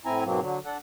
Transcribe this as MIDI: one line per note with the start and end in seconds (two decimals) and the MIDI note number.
0.05 0.24 45
0.05 0.24 60
0.05 0.24 64
0.05 0.24 80
0.05 0.24 82
0.25 0.40 44
0.25 0.40 47
0.25 0.40 54
0.25 0.40 58
0.25 0.40 60
0.41 0.58 50
0.41 0.58 54
0.65 0.77 62
0.65 0.77 69
0.65 0.77 78